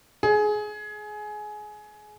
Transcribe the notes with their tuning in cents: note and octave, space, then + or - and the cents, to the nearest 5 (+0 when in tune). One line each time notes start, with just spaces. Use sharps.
G#4 +20